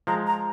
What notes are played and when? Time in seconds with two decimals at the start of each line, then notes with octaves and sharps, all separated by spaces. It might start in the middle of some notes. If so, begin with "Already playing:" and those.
0.07 F3 G#3 A#5
0.27 A#5